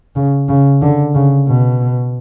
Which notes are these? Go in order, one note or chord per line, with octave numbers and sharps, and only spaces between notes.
C#3
C#3
D3
C#3
B2